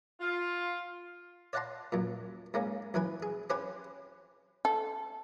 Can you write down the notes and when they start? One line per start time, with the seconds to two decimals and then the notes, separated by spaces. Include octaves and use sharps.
0.21 F4
1.53 C#5 D5 F#5 A5 A#5 C6
1.92 F#2 A#2
2.54 G#2 A#3 C#4
2.94 F#2 E3 B4 G#5
3.23 G#4
3.50 C4 C#4 G4 B4 C5 G#5
4.65 A4